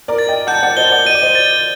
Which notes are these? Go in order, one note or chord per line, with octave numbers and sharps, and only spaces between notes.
A#4 D5
A6
D#5 G5
F#5 A5 G6
D5 F#5
C5 D#5 G7
D5 F#5
D#5 D#7
D5
C5 D#5
A6